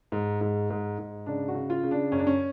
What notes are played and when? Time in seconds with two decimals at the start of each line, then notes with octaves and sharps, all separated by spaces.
0.12 G#2
0.41 G#2
0.70 G#2
0.99 G#2
1.26 C#3 D4
1.48 F#4
1.55 C#3
1.70 F4
1.83 C#3
1.91 D4
2.12 F#2 C#4
2.19 D4
2.27 C#4